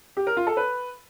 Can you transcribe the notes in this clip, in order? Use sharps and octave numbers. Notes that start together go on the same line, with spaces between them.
G4
A#4
F4
A4
B4